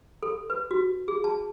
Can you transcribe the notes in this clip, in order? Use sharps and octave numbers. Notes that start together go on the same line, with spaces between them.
A4
B4
F#4
G#4
A5